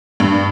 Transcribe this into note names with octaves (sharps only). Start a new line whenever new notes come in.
G2